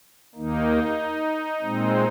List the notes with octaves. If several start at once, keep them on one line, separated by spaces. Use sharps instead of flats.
D#2 D#3 A#3 D#4
A#2 G#3 C4